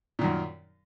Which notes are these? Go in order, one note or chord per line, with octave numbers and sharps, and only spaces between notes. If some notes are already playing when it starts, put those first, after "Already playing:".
F#2 A#2 D#3